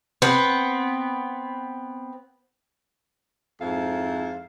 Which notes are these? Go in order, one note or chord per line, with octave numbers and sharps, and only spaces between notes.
B3 C4
F2 G#2 E4 A4 F5